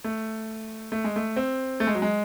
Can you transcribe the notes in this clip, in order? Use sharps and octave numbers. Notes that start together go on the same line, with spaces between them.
A3
A3
G#3
A3
C4
A3
G#3
F#3
G#3